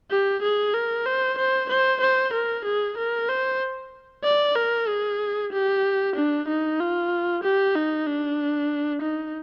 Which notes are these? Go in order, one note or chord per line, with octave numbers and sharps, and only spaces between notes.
G4
G#4
A#4
C5
C5
C5
C5
A#4
G#4
A#4
C5
D5
A#4
G#4
G4
D4
D#4
F4
G4
D#4
D4
D#4